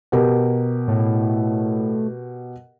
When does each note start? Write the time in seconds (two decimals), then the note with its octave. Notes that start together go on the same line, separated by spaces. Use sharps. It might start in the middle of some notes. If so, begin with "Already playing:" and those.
0.12 B2 G4 A#4
0.88 A2